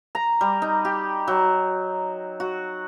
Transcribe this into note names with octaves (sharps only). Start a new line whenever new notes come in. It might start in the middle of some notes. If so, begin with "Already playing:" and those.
A#5
G3
D#4
G4
F#3
F#4